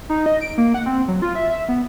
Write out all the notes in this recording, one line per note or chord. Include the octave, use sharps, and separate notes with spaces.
D#4
D#5
D7
A#3
F#5
C4
F#3
F4
E5
E5
B3